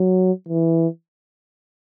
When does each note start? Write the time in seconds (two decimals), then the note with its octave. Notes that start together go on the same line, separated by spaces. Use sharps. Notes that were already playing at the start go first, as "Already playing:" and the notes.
Already playing: F#3
0.49 E3